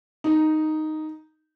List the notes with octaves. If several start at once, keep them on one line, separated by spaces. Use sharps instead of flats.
D#4